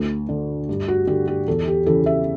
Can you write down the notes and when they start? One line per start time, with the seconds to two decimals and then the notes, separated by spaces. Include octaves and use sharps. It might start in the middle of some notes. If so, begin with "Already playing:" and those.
Already playing: D2
0.29 D3
0.69 G2
0.88 F#4
1.07 D3 G4
1.27 G4
1.48 E2 A4
1.68 G4
1.86 C#3 E3 A4
2.06 E5